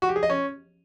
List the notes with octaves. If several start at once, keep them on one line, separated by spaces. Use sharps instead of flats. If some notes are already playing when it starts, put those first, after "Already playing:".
F#4
G4
G#4
D#5
C#4